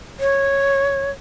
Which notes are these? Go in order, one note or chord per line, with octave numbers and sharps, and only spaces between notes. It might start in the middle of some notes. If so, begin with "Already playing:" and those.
C#5